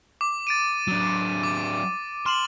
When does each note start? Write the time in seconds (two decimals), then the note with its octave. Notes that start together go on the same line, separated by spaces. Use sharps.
0.21 D6
0.47 A6 D7 D#7
0.88 F#3 D4
1.44 D6
2.26 C6 F6 E7 F#7